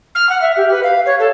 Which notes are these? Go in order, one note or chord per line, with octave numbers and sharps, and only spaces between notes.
F6
F#5
E5
G4
B4
F5
C#5
A4